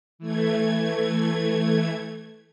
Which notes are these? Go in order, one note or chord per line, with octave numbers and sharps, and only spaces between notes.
E3 A3 G#6